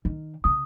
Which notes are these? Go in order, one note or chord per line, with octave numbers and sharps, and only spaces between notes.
D#3
C#3 D#6